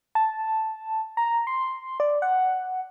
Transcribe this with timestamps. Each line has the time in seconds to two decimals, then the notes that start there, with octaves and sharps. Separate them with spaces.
0.15 A5
1.17 A#5
1.47 C6
2.00 D5
2.22 F#5